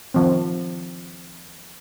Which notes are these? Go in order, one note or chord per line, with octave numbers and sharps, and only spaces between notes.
D#3 F3 C4